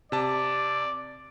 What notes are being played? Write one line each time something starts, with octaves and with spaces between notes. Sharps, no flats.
C3 D5 A5